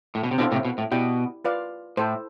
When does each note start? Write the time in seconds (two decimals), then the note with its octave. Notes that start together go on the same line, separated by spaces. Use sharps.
0.15 A2
0.24 B2
0.31 C3
0.38 B2 D3 C4 E4 A4 C5 F5
0.52 A2 C3
0.65 B2
0.78 A2
0.92 B2 E4 G4 D5 G5
1.45 F4 B4 D5 F5
1.97 A2 E4 A4 C5